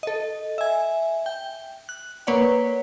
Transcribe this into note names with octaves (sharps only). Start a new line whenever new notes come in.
A4 D#5
E5 G#5
G5
F#6
A#3 B4 C#5 D5 F#5